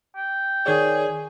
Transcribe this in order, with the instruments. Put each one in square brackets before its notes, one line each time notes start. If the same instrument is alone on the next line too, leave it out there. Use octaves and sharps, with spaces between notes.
[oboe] G5
[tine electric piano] D#3 C#5 D5 [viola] G#4